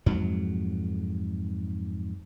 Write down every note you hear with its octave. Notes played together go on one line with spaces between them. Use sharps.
F2 G#2 F#3